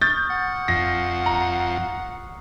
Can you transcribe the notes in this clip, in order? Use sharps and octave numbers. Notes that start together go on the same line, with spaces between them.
C#6 D#6 F6 G6 A6
F#5
F2 A#6 C7
A#5